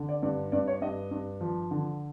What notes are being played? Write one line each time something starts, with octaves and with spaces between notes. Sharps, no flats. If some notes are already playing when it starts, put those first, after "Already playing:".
Already playing: D3
D5
G2 D5
G2 D5
C#5
G2 D#5
G2
F3
D3